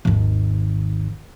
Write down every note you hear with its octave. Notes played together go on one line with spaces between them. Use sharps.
G#1 D#2